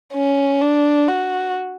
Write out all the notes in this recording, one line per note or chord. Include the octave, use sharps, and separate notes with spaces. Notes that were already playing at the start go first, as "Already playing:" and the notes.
C#4
D4
F#4